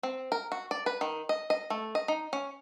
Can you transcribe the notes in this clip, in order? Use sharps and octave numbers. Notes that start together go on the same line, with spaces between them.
C4
A#4
F#4
D5
B4
D#3
D#5
D#5
A3
D#5
D#4
C#4